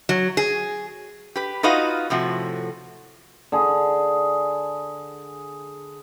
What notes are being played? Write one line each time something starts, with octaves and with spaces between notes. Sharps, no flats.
F#3
G#4
G4 B4
D#4 F4 F#4 B4 D#5 F5
A2 C3 F3 F#4
D3 G#4